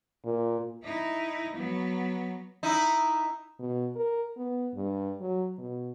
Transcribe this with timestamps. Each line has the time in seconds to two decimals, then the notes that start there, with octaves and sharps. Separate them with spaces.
0.25 A#2
0.83 D#4 E4
1.56 F#3 B3
2.63 D#4 E4
3.60 B2
3.96 A#4
4.37 B3
4.74 G2
5.21 F#3
5.58 B2